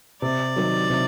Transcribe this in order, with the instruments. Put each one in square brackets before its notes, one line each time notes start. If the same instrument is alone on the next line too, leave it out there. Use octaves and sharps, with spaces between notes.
[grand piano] C3 [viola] D5
[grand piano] D#3 F#3
C3